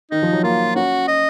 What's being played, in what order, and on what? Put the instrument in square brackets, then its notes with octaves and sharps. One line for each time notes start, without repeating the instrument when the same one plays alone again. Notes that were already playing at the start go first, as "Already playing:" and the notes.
[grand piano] D#3 [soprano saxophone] D#4
[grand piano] F3
F#3
[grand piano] A#3 [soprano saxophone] F4
[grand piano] C#4 [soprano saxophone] F#4
[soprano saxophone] D#5